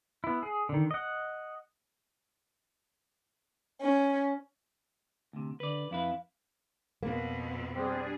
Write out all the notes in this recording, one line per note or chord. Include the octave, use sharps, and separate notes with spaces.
B3 E4
G#4
D3 D#3
D#5 F#5
C#4
D2 C3
D3 B4 D5
F2 E4 B4 F5
F2 B2 A#3
G3 C4 D4 G#4